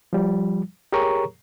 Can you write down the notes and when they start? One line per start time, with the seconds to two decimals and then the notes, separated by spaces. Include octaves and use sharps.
0.13 F3 G3
0.92 G4 G#4 A#4 C#5 A#5 C#6